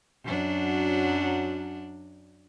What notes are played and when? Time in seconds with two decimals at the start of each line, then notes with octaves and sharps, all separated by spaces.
0.24 F#2 F#3 D4